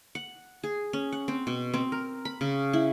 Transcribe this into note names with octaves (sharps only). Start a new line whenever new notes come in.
F#5
G#4
C#4
F#5
C4
B2
C4
A#4
B5
C#3
E4